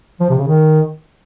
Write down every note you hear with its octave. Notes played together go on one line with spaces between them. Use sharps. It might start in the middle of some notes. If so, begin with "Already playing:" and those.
F3
C3
C#3
D#3